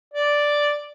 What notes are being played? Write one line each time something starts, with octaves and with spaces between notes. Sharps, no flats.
D5